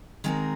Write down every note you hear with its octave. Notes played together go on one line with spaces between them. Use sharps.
D#3 G#3 C4 D#4 A#4